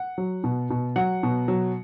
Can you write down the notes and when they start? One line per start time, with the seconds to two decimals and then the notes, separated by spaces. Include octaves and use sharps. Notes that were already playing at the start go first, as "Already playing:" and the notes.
Already playing: F#5
0.18 F#3
0.44 B2
0.70 B2
0.96 F#3 F#5
1.23 B2
1.48 F#3